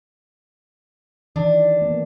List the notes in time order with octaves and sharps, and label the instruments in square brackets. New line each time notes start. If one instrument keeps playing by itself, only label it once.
[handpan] D#3 E3 [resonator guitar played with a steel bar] D4
[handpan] A#3 B3